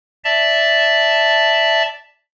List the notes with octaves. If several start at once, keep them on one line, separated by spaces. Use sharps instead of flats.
D5 E5 A5